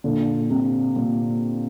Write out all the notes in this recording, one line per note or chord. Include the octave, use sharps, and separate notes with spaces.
A#2 D3
C3
A#2